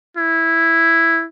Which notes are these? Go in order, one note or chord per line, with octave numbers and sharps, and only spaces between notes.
E4